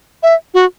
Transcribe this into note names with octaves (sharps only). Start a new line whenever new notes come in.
E5
F#4